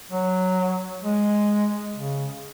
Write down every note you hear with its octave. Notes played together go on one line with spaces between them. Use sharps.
F#3
G#3
C#3